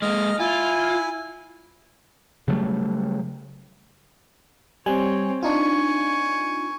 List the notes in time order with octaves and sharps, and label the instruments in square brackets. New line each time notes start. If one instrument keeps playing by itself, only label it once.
[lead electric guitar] G#3 A#3 [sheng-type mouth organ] D#5 F6
[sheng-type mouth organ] E4 G#5 [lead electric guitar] F4
[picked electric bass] C#3 F#3 G3 A3
[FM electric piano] G3 G#5 [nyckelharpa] C4 C#5
[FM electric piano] D4 D#4 F4 [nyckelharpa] G#5 C#6